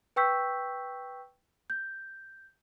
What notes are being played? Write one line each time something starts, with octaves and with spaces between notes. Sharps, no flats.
B4 G5 C#6 E6 G6 B6
G6